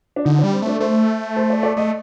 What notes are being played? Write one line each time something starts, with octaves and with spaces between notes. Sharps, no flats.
D4
D3 D#4
G3 D4
C4
A3 D4
A3 C5
C5
D5
D5
A3 D#5